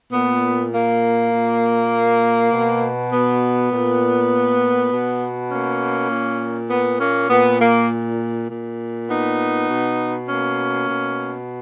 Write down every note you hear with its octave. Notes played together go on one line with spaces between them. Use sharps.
A#2 B3
A#3
A#2
B2
B3
A#2
B2
A#3 C#4
A#2
B3
A#3 C#4
A#2 B3
A#3
A#2
B3 D#4
B2
A#3 C#4
B2